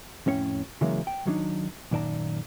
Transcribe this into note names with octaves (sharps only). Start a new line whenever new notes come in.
F2 A2 C#4 C#5 F5 G5
C#3 E3 F#3 G#3 A#3 C#4
G5
D#3 F#3 G3 D4 D#4
F#2 A#2 D#3 D5 A5 A#5